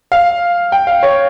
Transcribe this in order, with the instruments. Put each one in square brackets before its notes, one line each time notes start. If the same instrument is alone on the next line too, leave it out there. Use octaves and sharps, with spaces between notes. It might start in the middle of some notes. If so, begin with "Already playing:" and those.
[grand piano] F5
G5
F5
C#5